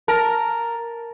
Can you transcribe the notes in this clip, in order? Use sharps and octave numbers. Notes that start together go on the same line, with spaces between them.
A#4 A5